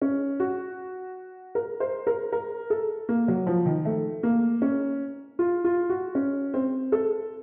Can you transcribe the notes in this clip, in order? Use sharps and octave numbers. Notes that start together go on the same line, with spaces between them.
C#4
F#4
A#4
C5
A#4
A#4
A4
A#3
F#3
F3
D#3
A3
A#3
C#4
F4
F4
F#4
C#4
C4
A4